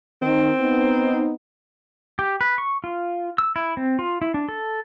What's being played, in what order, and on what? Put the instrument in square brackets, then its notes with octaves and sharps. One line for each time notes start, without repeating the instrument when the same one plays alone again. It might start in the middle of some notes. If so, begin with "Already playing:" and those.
[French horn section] D#3 [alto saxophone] C4
[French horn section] B3 D#4
[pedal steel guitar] G4
B4
C#6
F4
E6
E4
C4
F4
E4
D4
A4